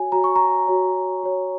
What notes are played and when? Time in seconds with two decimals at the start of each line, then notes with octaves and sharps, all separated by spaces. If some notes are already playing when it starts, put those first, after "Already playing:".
Already playing: F#4 C#5 G#5
0.12 F#4 C#5 A#5
0.24 C#6
0.36 A#5
0.68 F#4 C#5
1.23 F#4 C#5